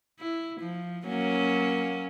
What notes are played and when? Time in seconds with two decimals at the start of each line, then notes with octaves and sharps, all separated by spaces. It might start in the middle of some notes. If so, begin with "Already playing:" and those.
0.20 E4
0.60 F3
1.07 F#3 A#3 C#4